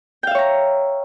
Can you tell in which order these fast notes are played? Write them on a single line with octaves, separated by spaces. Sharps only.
G5 F5 E5 C#5 A#5